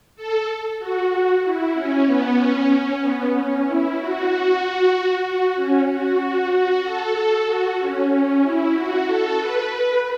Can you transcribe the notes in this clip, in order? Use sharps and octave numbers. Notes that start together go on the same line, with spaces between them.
A4
F#4
E4
C#4
B3
C#4
C#4
B3
C#4
E4
F#4
F#4
C#4
F#4
F#4
A4
A4
F#4
C#4
C#4
E4
F#4
A4
B4
B4